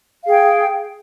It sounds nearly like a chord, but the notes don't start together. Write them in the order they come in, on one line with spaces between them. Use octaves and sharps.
F5 G#4 G5